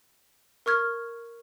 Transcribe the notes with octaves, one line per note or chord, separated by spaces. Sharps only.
A#4 C#6 F6 G#6